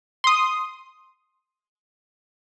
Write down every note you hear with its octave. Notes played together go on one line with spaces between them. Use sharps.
C6 D#6